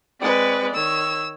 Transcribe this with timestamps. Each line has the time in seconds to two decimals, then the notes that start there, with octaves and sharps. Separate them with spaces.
0.21 G#3 C4 B4 D5
0.74 D#3 C#5 E6